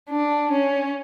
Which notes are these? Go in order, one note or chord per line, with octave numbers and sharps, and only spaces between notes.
D4
C#4